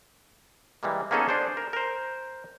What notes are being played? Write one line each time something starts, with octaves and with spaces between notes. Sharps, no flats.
E3 G3 G#3 A#3
A#3 B3 C#4 D#4 G#4 A4
D4 G#4 C5
A#4
A#4 C5